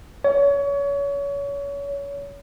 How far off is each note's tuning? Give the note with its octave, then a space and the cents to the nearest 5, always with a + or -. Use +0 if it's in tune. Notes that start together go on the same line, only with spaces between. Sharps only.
C#5 +30